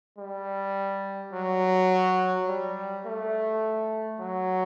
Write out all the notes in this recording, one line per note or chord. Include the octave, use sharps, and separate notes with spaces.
G3
F#3
G3
A3
F#3